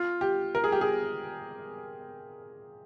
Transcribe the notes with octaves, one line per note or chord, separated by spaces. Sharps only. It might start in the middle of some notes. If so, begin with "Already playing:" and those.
Already playing: F4
G4
A#4
G#4
G4
G#4